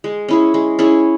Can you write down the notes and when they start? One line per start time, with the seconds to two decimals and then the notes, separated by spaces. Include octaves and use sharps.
0.04 G#3
0.28 C#4 E4 G#4
0.54 G#3
0.79 C#4 E4 G#4